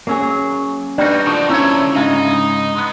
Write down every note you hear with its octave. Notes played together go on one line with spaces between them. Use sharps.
F#3 A#3 C#4 G#4
G3 D4 D#4 F#4 B4 D5 G5
D3 F3 C#6 D#6
C#4 E4 C#5 E5
G#2 C#3 G#3 D4 D#4 E5 F5
G#3 B3